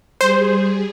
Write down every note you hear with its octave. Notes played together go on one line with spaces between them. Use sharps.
G3 G#4 C5